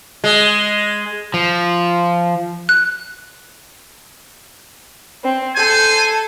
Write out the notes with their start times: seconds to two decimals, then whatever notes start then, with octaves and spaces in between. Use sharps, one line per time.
0.24 G#3
1.34 F3
2.69 F#6
5.23 C4
5.56 A4 C5 G#5